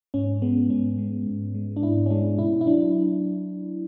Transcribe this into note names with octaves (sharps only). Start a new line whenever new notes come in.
G#2 C#4
G#3 B3
G#2 C#4
G#3
G#2
G#3
D4
G#2 E4
C#4
G#3 D4
B2 E4
E4
F#3 D4